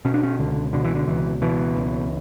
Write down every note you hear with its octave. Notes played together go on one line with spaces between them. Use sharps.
B2 C#4
D4
C#4
C#2 D3
B2 D3
E3
D3
C#2 E3
B2 E3
C#2